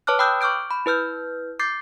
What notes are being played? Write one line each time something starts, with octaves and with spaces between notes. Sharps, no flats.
B4 C#5 A5 D6 F6 F#6
G5 B5 D#6 E6 F#6 G6
C#6 D6 F6 G6 D7
B5
E4 B4 F6 G6
D6 G6 A6 C7